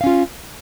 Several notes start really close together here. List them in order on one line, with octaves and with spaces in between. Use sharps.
F5 C#4 F4